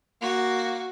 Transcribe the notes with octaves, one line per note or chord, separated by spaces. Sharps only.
A#3 F#4